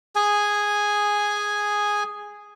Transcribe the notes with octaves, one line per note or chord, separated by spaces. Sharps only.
G#4 G#5